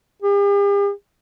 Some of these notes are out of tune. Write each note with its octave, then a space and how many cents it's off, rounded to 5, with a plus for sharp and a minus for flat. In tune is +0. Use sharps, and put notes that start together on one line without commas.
G4 +45